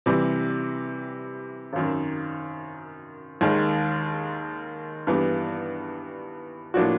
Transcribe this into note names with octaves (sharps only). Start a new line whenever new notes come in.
C3 E3 G3
G#1 F#2 D#3
D#2 D#3 G#3
G2 E3 G3 B3
A2 F3 A#3 D4 F#4